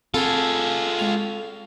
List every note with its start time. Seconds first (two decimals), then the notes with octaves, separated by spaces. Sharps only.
0.14 C4 F4 G#4 A4
0.99 G#3 F7